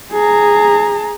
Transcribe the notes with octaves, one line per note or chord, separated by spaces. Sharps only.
G#4 A#5